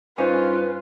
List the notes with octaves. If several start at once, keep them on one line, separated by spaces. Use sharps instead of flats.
G2 C#4 D#4 F4 B4 C5 G#5